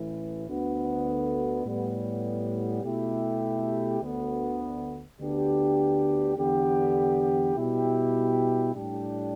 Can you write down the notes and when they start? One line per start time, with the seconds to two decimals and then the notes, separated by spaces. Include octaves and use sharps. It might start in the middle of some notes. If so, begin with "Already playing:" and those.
Already playing: A1 A2 E3
0.47 D2 D3 B3
1.65 A2 G3 B3
2.83 B2 A3 E4 G4
4.01 D2 D3 B3
5.19 D2 D3 B3 D4 G4
6.36 E2 D3 B3 G4
7.55 B2 G3 E4 G4
8.73 A2 G3 D4 G4